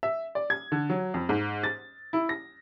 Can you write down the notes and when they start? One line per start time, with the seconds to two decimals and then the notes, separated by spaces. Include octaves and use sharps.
0.03 E5
0.35 D5
0.50 G#6
0.72 D3
0.90 F#3
1.14 F2
1.29 G#2
1.63 A6
2.13 E4
2.29 A#6